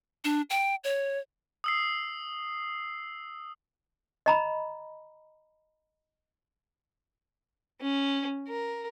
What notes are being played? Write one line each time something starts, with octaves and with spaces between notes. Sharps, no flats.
D4
G5
C#5
D#6 E6 C7
D#5 A#5 B5
C#4
A#4